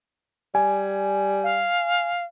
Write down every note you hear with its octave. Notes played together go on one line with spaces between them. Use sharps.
G3 G#5
F5